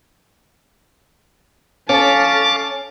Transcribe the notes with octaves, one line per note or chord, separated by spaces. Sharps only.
C#4 A4 F5 A5 D6 A6